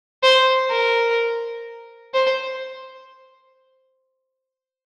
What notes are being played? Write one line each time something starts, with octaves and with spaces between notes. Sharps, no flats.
C5
A#4
C5